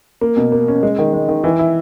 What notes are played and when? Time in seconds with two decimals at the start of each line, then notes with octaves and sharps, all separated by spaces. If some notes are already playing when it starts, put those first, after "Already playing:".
0.21 A#3
0.37 B2
0.52 A#3
0.68 C#4
0.83 G#3
0.99 D#3
1.13 G#3
1.28 D#3
1.44 E3
1.59 E4